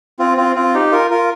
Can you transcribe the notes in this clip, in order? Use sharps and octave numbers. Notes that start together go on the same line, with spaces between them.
C4 F4
C4 F4
C4 F4
D#4 G4
F4 A#4
F4 A#4